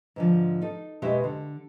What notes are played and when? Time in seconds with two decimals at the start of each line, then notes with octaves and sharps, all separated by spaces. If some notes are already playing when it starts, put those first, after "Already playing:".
0.16 G#2 D3 F3
0.61 D#4 A4
1.02 B2 G#3 B3 G4 C5 E5
1.24 D3